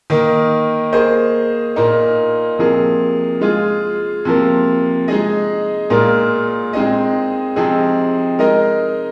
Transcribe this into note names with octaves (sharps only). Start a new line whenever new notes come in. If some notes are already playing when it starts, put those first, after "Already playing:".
D#3 A#3 D#4
A#3 G#4 C5 D#5
A#2 A#3 D#4
C3 F3 A#3 G#4
G#3 F4 G#4
C3 F3 A#3
G#3 D#4 G#4 D#5
A#2 G#3 F4 A#4
G#3 C4 D#4 G#4 D#5
C3 F3 C4 D#4 G#4
G#3 D#4 A#4 D#5